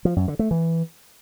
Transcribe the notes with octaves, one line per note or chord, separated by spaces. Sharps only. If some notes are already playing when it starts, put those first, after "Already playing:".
F3
F#2
D3
A3
E3